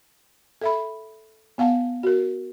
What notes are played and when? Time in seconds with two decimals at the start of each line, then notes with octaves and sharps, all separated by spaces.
0.61 A4 E5 B5
1.58 B3 F5 F#5 A5
2.03 F#4 A#4